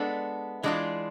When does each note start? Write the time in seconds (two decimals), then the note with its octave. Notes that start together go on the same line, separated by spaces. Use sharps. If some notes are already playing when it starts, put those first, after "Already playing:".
Already playing: G#3 B3 D4 A4
0.63 E3 G#3 D4 F4